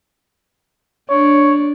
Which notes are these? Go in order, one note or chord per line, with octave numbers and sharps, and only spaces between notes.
D4 C#5